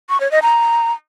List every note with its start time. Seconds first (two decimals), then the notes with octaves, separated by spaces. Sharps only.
0.09 C#6
0.20 C#5
0.31 D#5
0.43 A#5